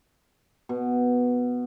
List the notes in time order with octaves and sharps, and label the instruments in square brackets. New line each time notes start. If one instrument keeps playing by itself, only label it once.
[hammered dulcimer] B2